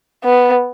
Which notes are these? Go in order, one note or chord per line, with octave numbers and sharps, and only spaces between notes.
B3